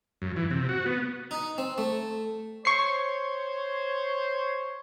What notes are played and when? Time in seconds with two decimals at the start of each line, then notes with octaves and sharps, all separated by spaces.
0.22 F#2
0.36 E3
0.51 C3
0.69 F#4
0.86 B3
1.31 D#4
1.58 C4
1.78 A3
2.65 C5 C#5 C#6 C7